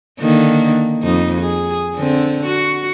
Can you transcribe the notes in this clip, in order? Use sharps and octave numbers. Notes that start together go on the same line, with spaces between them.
D3 D#3 A#3
F2 D#4
G#4
D3 C4
F#4